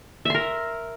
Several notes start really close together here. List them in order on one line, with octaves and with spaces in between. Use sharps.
E5 C6 A#4